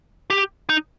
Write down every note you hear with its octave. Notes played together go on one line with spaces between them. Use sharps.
G4
D#4